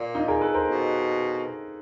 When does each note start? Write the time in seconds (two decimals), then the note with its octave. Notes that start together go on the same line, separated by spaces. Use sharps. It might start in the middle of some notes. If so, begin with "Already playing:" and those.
Already playing: A#2
0.15 D#4 F4
0.28 G#4 A#4
0.41 A4 B4
0.54 A#4 C5
0.68 B2